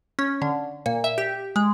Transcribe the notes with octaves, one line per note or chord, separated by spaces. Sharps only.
C#4
D3
A#2
E5
G4
G#3